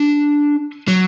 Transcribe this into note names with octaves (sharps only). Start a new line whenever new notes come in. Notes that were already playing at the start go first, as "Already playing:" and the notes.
Already playing: D4
F#3